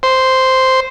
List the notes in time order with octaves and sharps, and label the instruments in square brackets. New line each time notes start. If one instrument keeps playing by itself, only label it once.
[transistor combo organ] C5